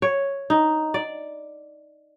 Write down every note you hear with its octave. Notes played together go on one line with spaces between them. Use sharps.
C#5
D#4
D5